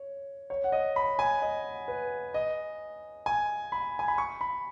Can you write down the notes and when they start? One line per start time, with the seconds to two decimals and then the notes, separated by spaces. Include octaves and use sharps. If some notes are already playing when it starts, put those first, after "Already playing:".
Already playing: C#5
0.50 C#5
0.64 F#5
0.72 D#5
0.96 B5
1.19 G#5
1.42 D#5
1.88 B4
2.34 D#5
3.26 G#5
3.72 B5
3.99 G#5
4.08 B5
4.18 C#6
4.41 B5